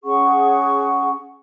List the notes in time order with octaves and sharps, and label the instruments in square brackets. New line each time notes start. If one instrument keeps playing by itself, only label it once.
[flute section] C#4 G#4 F#5 C#6